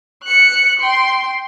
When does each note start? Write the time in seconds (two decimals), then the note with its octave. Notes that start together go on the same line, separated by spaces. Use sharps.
0.24 F#6 C#7
0.80 G5 C6